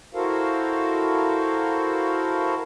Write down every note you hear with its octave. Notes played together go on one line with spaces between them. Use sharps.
E4 F#4 A4 A#4 C5 F5